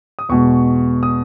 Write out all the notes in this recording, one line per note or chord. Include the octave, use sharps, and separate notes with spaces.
D#6
E2 B2 G#3 C#6
D#6